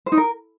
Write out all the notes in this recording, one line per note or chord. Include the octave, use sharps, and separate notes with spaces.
C5
D#4
A#4